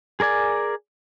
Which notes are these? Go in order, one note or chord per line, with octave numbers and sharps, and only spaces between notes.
G#4 A#4 D5 G#5